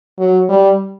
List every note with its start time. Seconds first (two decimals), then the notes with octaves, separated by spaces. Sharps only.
0.19 F#3
0.49 G3